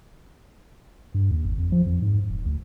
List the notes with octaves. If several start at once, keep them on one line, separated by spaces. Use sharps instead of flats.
G2
D#2
G#1
F2
F3
F2
G#2
D#1
D2